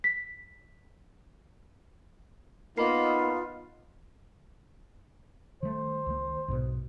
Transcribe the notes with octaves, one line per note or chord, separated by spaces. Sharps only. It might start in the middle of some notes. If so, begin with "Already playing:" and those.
B6
A#3 B3 D#4 F4 D#5 B5 C7
D#3 G3 A3 C5
C#2 D#3 A#3
B1 G#2 B2